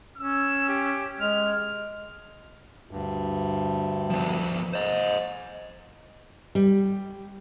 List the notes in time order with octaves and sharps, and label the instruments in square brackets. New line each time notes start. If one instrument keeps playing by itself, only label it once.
[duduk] C#4 [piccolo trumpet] E6
[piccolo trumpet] G4
[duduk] G#3 [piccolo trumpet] F6
[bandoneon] D2 G2
[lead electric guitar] F3 B3
C5 D#5
[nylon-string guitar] G3